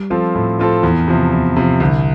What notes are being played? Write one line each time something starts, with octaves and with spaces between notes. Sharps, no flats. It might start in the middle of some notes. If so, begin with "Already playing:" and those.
Already playing: G3
F3 C4 F4 A4
A2
F3 C4 F4 A4
E2 E3
C3 F3
E2
C3 F3
C2 D3